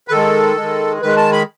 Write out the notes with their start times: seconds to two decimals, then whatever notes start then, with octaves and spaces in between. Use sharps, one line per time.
0.08 B4
0.11 D#3 G#3 A4
0.57 D#3 G#3
1.02 D#3 G#3 B4
1.17 A5
1.32 B5